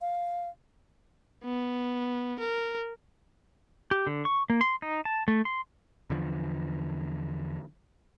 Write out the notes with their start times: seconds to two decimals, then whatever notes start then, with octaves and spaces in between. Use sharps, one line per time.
0.01 F5
1.44 B3
2.40 A#4
3.91 G4
4.07 D3
4.25 C#6
4.50 A#3
4.61 C6
4.82 D#4
5.05 A5
5.28 A3
5.45 C6
6.10 E2 D3 F3